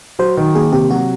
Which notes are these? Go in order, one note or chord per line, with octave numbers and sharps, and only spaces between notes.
F#3 C5
D#3
A#3 G#4
C3 G4
F#3 F#4